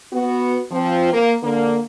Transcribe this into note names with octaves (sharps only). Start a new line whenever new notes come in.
B3 F#4
F3 C4
A#3
D3 A#3